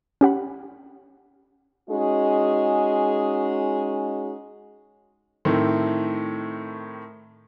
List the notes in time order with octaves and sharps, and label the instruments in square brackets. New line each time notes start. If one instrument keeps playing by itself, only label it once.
[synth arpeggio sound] C#4 G4 F#5 B5
[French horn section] G#3 C#4 D#4 F#4 G#4
[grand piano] A2 D#3 A3 C4